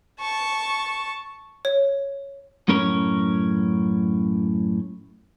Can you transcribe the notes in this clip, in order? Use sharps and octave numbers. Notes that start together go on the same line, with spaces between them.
A5 C#6
C#5
F#2 A2 C#4 A#4 C#5